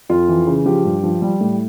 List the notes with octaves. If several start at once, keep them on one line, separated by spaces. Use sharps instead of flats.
F2 F4
E3
C#3
F3 G4
G2
F3
G3
A2